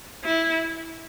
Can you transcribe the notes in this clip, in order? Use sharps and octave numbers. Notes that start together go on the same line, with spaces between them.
E4